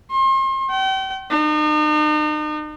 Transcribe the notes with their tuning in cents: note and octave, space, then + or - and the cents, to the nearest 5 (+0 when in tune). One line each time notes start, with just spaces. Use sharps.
C6 +40
G5 -40
D#4 -40